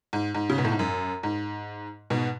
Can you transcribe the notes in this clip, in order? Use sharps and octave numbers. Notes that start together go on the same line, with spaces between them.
G#2
G#2
C#3
B2
A2
G#2
F#2
G#2
G#2 B2